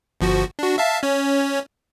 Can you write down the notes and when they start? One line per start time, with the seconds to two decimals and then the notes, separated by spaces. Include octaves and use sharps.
0.21 G1 F3 F#4
0.59 D4 F#4
0.78 E5 F5 A5
1.03 C#4 C#5